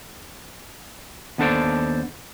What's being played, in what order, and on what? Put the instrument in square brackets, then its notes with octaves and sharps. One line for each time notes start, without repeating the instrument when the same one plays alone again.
[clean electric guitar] D#2 B3 D4 A4 C5 D5